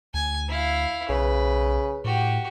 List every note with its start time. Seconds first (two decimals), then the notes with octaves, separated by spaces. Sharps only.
0.14 D2 G#5
0.49 E4 F5
1.09 B1 C#3 B4
2.04 A2 F#4 G4